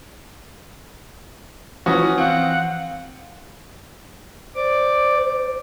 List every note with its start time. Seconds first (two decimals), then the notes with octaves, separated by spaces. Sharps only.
1.86 E3 F3 C#4 E4 F#4 D#6
2.18 C4 F5 F#5
4.56 C5 D5 D6